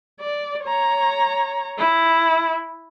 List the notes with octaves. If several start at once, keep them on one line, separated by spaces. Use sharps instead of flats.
D5
C#5 A#5
E4